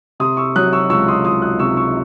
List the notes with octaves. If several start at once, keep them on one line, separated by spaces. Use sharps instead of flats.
C3 C6 D#6
C#6 E6
F#3 D#6 F#6
C#6 E6
C#2 C#6 E6
C6 D#6
C#2 C6 D#6
D#6 F#6
C3 C#6 E6
C#6 E6